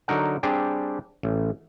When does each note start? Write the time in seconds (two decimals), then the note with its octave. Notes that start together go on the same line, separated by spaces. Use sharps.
0.08 D3 F#3 D#4 A#4 F#5
0.43 G3 C4 D4 G4 G#4 D5
1.23 A1